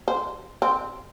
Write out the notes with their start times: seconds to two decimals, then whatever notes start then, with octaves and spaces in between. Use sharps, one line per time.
0.08 C5
0.62 C4